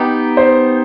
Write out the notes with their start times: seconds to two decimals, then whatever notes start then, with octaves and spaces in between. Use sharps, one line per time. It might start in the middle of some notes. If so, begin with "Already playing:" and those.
Already playing: B3 D#4 G4
0.37 C5